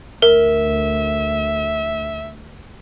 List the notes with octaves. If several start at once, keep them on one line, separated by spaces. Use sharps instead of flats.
D2 A#4 E5